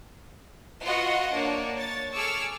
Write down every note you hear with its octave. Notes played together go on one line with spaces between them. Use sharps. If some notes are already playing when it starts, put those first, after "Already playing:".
F4 F#4 B4 D#5 F#5
A#3 D4 C#5
C#5 A6
G#4 A4 C#6 D6 E6 F6